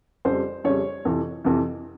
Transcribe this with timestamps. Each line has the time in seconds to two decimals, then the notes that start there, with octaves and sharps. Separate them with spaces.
0.25 F2 C#3 G3 C5
0.64 F2 C#3 G3 C#5
1.05 F2 C3 E3
1.44 F2 C3 E3